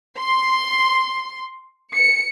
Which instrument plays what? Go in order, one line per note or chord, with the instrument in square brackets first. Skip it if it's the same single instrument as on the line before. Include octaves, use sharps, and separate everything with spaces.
[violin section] C6
C#7